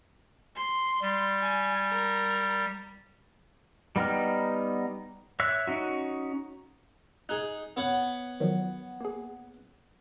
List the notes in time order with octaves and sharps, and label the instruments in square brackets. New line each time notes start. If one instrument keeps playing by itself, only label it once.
[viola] C6
[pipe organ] G3
[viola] G#5
A#4
[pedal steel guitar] G3 B3 D#4 G5 F6
C#5 E5 E6 F#6
C#4 D#4 F#4
[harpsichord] D#4 G#4 [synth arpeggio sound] F#6
[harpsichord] B3 C#5 F#5
[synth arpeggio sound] D#3 F3 F#3
A#3 G#4